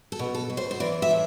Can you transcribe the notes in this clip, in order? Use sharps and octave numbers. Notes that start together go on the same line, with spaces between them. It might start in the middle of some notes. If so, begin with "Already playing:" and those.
A4
B2
A4
B2
C5
C5
E3 D5
E5
A2